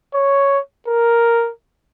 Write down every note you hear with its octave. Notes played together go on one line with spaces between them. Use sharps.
C#5
A#4